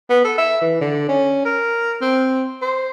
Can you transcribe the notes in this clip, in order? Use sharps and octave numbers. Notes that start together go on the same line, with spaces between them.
B3
A4
E5
E3
D3
C#4
A#4
C4
C5